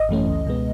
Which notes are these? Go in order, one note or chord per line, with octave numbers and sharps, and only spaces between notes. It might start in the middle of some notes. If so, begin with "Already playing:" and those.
Already playing: G#1 D#5
F#2 E3 A3 C#4
C#2
B2 G#3 B3